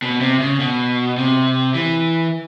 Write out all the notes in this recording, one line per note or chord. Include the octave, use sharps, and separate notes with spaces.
B2
C3
C#3
B2
C3
E3